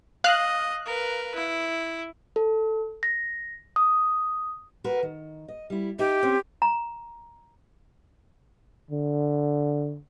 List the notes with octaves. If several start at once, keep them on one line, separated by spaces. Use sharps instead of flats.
D#5 F5 F#6
A#4 B4
E4
A4
A#6
D#6
F#4 A#4 B4
D#3
D#5
G3 E4
D#4 G4 E5
C4 C#4
A#5
D3